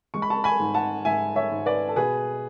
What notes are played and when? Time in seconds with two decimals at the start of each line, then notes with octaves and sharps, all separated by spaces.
0.14 G#3 C#6
0.22 B5
0.30 A5 C#6
0.44 G#5 B5
0.60 G#2
0.74 F#5 A5
1.05 G#2 E5 G#5
1.36 C#5 E5
1.52 G#2
1.66 B4 D5
1.89 A4
1.96 B2 G#4 B4